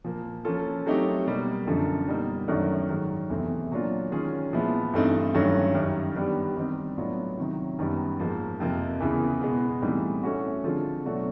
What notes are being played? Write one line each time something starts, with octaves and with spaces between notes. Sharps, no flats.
A#2 F3 A#3
F3 A#3 C#4 F4 A4
F#3 A3 C4 D#4 G4
B2 G3 A#3
F#2 D3 F3
B2 G3 A#3 D#4
F#2 D#3 F#3 A3 D4
G#2 D#3 F#3
E2 C3 E3 A3 C4
A#2 F#3 A#3 D4 F4
D#3 G#3 C#4 F4 G#4
A#2 F3 G#3 B3 E4
G2 E3 A3 C4 D#4
G2 D#3 F#3 A3 C#4
F#2 D#3 G3
D#3 G3 B3 D4 G4
D#3 G3 C4 D#4
A2 F#3 B3 D4 F4
C3 D#3 F#3
F#2 D#3 G3 B3
G#2 F3 A#3
F2 C3 F3 A#3
E2 C#3 E3
B2 G#3 B3
A2 E3 G3 C4 D#4
A3 C#4 F#4
D3 F3 G#3 C4 F4
B2 F#3 A3 D4 F#4